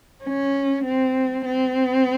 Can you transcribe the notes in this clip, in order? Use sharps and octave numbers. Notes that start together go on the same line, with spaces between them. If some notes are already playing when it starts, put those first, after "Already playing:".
C#4
C4
C4